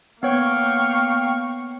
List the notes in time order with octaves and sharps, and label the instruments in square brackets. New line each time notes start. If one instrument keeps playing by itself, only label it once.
[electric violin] A#3 C#6 [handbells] B3 C#5 G#6 [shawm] F5 [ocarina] G5